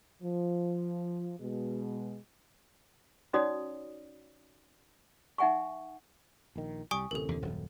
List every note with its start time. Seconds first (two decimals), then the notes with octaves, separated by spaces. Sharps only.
0.22 F3
1.39 B2 G#3
3.33 C#4 D#4 F#4 C#5 D5 D#6
5.38 D#4 E5 F#5 G#5 C#6
6.56 A#1 D#3
6.91 C2 G3 G#5 C#6 D#6
7.11 A1 D2 C3 A4 A#4
7.29 E2 D3
7.42 D#1 F#2